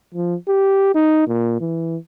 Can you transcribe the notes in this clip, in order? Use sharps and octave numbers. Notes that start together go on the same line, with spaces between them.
F3
G4
D#4
A#2
E3